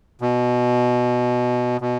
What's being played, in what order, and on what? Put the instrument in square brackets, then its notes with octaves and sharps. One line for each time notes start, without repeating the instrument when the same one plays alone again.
[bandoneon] B2
B2